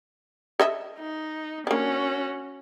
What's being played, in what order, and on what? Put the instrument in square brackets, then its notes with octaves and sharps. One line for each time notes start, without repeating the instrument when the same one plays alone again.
[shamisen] A4 D#5 E5
[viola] D#4
[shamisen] A#3 D4 [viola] C#4 F#4